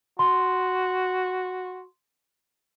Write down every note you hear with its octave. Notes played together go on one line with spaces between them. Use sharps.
F#4 C6